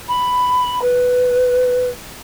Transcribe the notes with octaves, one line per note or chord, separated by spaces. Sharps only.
B5
B4